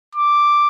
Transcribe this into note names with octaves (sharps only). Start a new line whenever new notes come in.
D6